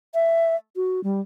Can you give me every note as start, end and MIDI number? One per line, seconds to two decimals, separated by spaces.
0.14 0.55 76
0.76 1.00 66
1.04 1.20 55